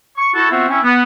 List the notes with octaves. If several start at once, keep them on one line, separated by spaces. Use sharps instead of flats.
C#6
E4 F#4 A4
B3 C4 F4 F#4 C5 E5
C4 C#4 E4
B3